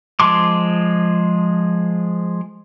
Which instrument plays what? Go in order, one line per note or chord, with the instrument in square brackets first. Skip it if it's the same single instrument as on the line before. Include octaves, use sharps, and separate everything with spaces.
[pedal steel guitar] F3 G#3 A5 C6 D6